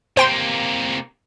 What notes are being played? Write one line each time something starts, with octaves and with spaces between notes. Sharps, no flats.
C3 A#3 C5 G5 C6